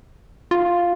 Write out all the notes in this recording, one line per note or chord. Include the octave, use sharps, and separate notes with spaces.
F4